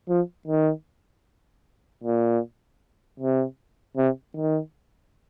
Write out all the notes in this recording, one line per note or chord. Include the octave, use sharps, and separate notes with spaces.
F3
D#3
A#2
C3
C3
D#3